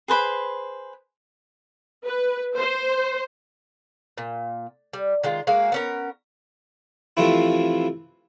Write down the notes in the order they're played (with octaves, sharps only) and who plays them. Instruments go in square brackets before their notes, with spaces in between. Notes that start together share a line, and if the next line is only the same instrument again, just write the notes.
[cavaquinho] G#4 B4 C5 B5
[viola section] B4
C5
[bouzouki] A#2
G3
D#3 G#3 F4
G#3 A#3 F#4 F5
B3 C#4 A#4
[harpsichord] C3 E3 F3 A3 C4 E4